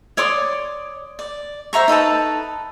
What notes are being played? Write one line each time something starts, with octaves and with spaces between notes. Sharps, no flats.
C#5 D5 C6 D#6
D5
C5 E5 A#5 C#6
D#4 A4 B4 A5